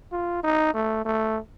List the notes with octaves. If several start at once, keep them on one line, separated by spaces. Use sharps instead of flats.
F4
D#4
A3
A3